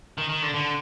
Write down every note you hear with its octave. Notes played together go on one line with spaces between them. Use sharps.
D#3
D#3
D3
D3